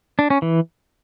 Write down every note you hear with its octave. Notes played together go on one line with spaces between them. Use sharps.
D4
C#4
E3